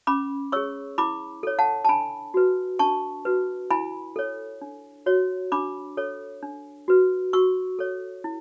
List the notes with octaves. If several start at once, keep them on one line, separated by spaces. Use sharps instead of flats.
C#4 B5 D6
G#4 C#5 C#6 E6
E4 B5 D6
A4 C#5
F#5 A5
A5
D4 G#5 B5
F#4 B4
D4 A5 C#6
F#4 B4
E4 G#5 B5
A4 C#5
D4
F#4 C#5
D4 B5 D6
A4 C#5
D4
F#4 B4
F#4 C#6 E6
A4 C#5
E4